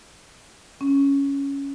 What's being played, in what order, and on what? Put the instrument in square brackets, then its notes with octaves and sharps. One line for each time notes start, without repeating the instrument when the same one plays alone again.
[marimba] C#4